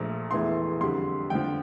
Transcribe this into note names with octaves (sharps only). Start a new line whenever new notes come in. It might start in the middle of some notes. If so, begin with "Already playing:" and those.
Already playing: A#1 A#2 F3 A3
E1 E2 E3 A3 C6
F2 D3 G3 C6
F2 D3 F3 G5